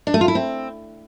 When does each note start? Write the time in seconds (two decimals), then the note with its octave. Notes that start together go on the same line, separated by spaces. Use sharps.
0.07 D4
0.14 A3
0.21 F4
0.28 E4
0.35 C4